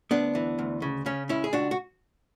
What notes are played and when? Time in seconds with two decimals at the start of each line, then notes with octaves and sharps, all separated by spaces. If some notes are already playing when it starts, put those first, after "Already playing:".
0.11 D2 B3 D4
0.35 E3
0.59 D2
0.82 C#3
1.06 C#3 C#4
1.29 C#2 C#4 E4
1.44 G#4
1.53 C#2 D4 F#4
1.71 F#4